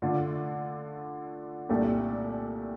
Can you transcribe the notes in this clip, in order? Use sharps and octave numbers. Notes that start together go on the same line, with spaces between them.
D3 A3 D4 F4
C2 A#2 A3 D4 G4